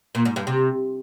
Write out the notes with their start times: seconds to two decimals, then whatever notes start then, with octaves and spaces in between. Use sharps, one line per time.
0.15 A#2
0.25 G#2
0.36 G2
0.47 C3